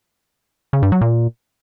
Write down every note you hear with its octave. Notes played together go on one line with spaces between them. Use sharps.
C#3
G2
F#3
A#2